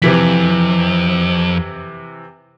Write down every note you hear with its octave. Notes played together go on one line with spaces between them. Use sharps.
F2 C3 E3 B6